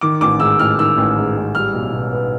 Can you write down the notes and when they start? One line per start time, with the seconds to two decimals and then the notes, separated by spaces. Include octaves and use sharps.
0.01 D#3 D6
0.21 A1 D6
0.40 G#2 E6
0.59 A1 F6
0.79 D#3 E6
0.98 A1
1.16 G#2
1.36 A1
1.55 G3 F6
1.74 B1
1.92 B2
2.13 B3